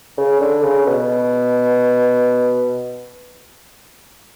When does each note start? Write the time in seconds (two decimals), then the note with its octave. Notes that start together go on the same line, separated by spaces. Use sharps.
0.18 C#3
0.40 D3
0.63 C#3
0.86 B2